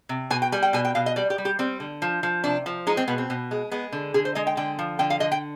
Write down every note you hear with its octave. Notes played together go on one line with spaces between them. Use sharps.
C3
B2 G#5
G5
G3 G#5
G5
B2 G#5
G5
B2 F5
D#5
G3 D5
G4
G3
G4
G3 C4
D3
F3
F3
C3 D4
F3
G#3 D#4
C4
B2 B3
C4
B2
G#3
G#3 B3
D3
D3 G#4
C5
G#3 D#5
G5
D3 G5
F3
D3 G5
F5
D3 D#5
G5